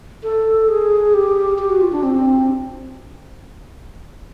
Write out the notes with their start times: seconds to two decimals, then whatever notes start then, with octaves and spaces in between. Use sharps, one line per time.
0.23 A4
0.69 G#4
1.14 G4
1.58 G4
1.70 F#4
1.81 F4
1.92 D4
2.03 C4